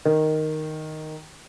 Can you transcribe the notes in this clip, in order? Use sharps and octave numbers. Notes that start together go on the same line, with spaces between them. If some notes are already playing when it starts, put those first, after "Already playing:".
D#3